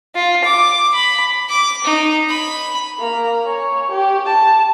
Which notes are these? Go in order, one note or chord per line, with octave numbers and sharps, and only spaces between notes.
F4
D6
B5
D6
D#4
B5
A#3 A#5
C#5 G#5
G4
A5